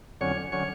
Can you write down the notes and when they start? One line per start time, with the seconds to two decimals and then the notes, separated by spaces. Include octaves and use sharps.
0.21 F2 D3 F#3 C#4 C#5
0.52 D3 F#3 C#4 C#5